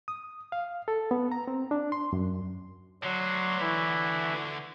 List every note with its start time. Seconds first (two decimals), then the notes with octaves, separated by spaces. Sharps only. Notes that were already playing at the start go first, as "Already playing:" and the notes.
0.08 D#6
0.52 F5
0.88 A4
1.11 B3
1.32 A#5
1.48 C4
1.71 D4
1.92 C6
2.13 F#2
3.03 D3 F#3 F#4 C6
3.60 E3 E4 E5